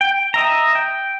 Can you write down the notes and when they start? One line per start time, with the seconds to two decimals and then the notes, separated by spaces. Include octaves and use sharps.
0.01 G5
0.34 D#5 E5 A#5
0.75 G5